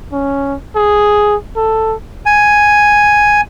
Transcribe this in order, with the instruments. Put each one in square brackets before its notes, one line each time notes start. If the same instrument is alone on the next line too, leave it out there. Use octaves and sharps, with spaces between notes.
[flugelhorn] C#4
G#4
A4
[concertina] G#5